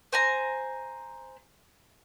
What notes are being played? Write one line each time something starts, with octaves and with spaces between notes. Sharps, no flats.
C5 G#5 A#5